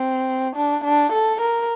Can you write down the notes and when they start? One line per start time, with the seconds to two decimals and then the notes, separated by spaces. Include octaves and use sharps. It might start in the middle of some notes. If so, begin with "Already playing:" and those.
Already playing: C4
0.56 D4
0.84 D4
1.13 A4
1.41 A#4